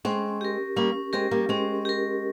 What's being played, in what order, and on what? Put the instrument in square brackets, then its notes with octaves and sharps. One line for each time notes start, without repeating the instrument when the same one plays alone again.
[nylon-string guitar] G#3 C4 [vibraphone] C#4
[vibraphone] G4 A#4
[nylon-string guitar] G3 A#3 [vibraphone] C#4
[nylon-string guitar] G#3 C4 [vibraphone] G4 A#4
[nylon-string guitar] G3 A#3
[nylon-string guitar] G#3 C4 [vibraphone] C#4
[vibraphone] G4 A#4